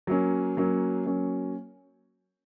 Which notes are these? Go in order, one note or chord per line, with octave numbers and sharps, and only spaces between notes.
F#3 A#3 C#4
F#3 A#3 C#4
F#3 A#3 C#4